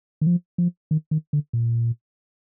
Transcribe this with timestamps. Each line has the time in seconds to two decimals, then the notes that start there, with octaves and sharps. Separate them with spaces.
0.21 D#3
0.27 F3
0.58 F3
0.91 D#3
1.11 D#3
1.33 D3
1.53 A#2